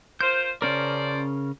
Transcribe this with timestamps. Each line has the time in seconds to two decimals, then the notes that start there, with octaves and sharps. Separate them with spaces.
0.21 F4 A#4 C5 G6
0.62 C#3 F3 C#4 A#4 C5 D5